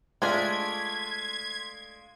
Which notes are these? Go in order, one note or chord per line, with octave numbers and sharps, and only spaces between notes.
G#3 A3 D4 F4 C6 G#6 B6